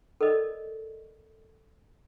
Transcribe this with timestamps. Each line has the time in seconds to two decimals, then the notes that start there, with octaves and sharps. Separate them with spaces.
0.21 A4 A#4 D5 D#5